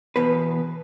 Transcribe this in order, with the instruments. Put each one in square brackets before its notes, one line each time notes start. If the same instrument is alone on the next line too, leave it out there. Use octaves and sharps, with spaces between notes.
[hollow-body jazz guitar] E2 B2 B4